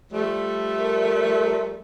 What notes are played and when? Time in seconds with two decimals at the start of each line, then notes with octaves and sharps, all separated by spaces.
0.12 F3 G3 A3
0.79 A#4